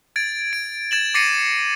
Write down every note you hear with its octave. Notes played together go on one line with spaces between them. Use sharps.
G#6 A6 D7
D7
G#6 A6 E7 F#7
D6 A6 A#6 C7 C#7 D#7